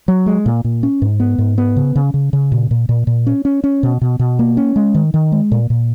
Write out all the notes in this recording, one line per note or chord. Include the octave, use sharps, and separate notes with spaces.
F#3
G#3
A#2
A#2
C#4
G#2
B3
G#2
B3
C#3
C#3
C#3
C#3
A#2
A#2
A#2
A#2
C#4
C#4
C#4
B2
B2
B2
A#3
C#4
G#3
D#3
D#3
G#3
A#2
A#2